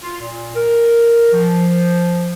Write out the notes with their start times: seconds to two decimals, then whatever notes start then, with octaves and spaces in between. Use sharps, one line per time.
0.03 F4
0.21 A#2
0.56 A#4
1.33 F3